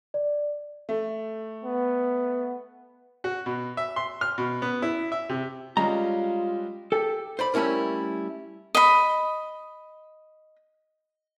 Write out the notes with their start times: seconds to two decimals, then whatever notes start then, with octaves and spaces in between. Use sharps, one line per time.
0.14 D5
0.89 A3
1.64 B3
3.24 F#4
3.46 B2
3.77 E5
3.96 C6
4.21 F6
4.38 B2
4.62 B3
4.82 E4
5.12 E5
5.29 C3
5.77 G3 G#3 C#4 F4 A#5
6.92 G4 A4
7.39 C5 D5 B5
7.54 G3 A3 C#4 E4 A#4
8.75 D#5 B5